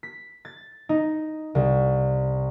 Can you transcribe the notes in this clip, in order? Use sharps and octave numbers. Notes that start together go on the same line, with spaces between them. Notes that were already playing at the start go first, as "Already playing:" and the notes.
B6
A6
D#4
C2